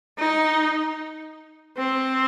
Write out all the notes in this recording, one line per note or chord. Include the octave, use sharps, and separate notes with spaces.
D#4
C4